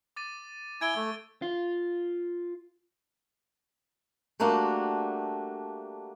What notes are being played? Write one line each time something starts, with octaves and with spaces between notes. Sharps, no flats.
D6 A6 D#7
E4 G#5 G#6 D7 G7
A3
F4
G3 A3 A#3 D4 F#4